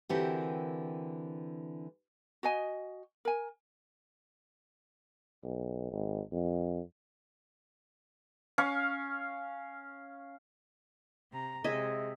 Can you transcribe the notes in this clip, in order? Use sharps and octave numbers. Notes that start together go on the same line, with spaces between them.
D3 E3 C4 F#4 G4 A#4
F#4 D#5 G#5
A#4 G#5
B1
G#1
F2
C#4 F5 C#6
C3 A#5
C3 G#3 D#5 E5 G#5